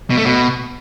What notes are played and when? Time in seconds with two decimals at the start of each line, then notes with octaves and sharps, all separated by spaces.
0.10 B2
0.17 A3
0.25 B2